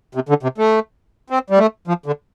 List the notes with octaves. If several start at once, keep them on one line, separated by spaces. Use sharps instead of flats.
C3
D3
C3
A3
C4
G3
A3
F3
D3